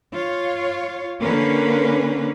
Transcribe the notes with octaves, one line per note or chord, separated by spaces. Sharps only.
F4 C#5 F5
D3 A#3 C#4 B4